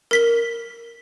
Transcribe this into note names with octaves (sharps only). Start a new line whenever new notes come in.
A#4 B6 G7